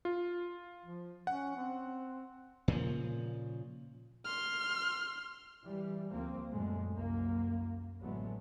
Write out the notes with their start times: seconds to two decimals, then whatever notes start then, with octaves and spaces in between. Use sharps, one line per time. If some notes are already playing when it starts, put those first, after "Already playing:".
0.05 F4
0.85 F3
1.27 C#4 F#5
1.56 C4
2.68 A#2 C#3 F3
4.25 C6 F6
5.65 E3 G3
6.11 D2 F3 A#3 C4
6.50 F#2 A#2 G#3 A3
6.93 C2 F#2 A#3
8.01 A1 D3 F#3 G#3 A3 B3